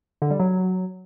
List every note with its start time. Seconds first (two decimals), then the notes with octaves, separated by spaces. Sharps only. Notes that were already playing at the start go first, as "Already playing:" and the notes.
0.22 D3
0.31 G3
0.40 F#3